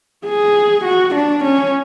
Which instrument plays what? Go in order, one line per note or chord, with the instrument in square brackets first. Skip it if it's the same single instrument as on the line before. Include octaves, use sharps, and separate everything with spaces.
[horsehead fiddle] G#4
F#4
D4
C#4